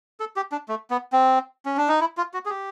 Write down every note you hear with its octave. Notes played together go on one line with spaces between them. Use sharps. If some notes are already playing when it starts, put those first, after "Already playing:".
A4
G4
D4
A3
B3
C4
C#4
D4
D#4
E4
F4
F#4
G#4
G4